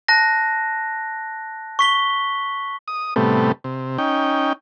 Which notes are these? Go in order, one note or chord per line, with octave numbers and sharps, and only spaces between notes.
A5 F#6 A#6
C#6 B6 G7
D#6
A2 C3 G3 A3 B3
C3
C#4 D#4 G5